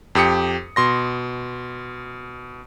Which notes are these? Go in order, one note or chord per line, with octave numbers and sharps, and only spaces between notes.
F2 G4 D#6 C#7
B2 C6 A#6